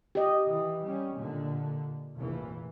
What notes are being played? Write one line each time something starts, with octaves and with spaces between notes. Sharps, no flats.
G4 D#5
E3
G3 C#4
A#2 D3
F1 A#1 E3